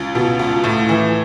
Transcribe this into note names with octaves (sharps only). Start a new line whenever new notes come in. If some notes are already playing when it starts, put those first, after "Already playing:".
Already playing: C#2
B2
C#2
A2
E3